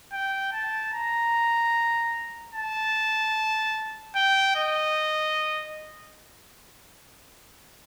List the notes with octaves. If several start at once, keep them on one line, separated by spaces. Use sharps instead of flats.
G5
A5
A#5
A5
G5
D#5